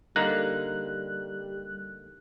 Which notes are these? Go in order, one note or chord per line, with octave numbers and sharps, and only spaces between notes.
D3 G3 A#3 D#4 F#6